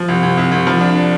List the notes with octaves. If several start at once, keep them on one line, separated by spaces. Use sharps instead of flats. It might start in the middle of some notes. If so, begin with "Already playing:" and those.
Already playing: F3
C2
C2
C2
C2
F3
D4